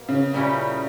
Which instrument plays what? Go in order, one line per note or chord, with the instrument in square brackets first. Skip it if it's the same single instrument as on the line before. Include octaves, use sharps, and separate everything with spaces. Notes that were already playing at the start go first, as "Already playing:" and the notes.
Already playing: [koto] B2 A#3
[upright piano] C#3
[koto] A#2 G3 C#4 E4 G4